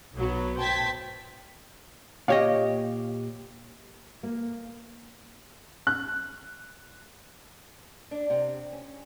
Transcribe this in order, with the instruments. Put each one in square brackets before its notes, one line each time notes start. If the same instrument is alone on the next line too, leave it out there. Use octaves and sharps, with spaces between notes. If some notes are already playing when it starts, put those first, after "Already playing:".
[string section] B1 F#3 B3
C5 G5 A5 G#6 B6
[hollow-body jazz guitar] A#2 G4 D#5 [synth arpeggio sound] C#5 F5
[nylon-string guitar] A#3
[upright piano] F#6
[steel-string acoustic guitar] D4
C3
C#4